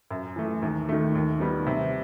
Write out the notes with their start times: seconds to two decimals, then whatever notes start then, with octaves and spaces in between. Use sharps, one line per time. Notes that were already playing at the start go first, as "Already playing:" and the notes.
0.11 F#2
0.36 E3 A3
0.62 D#2
0.89 D#3 A3
1.15 D#2
1.40 D#3 G3 B3
1.66 C3